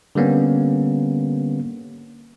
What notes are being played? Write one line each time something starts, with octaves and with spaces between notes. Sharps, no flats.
D3 G3 A#3 B3 C#4